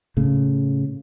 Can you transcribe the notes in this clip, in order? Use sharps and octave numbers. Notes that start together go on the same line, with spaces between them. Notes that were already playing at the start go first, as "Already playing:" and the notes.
A2 C#3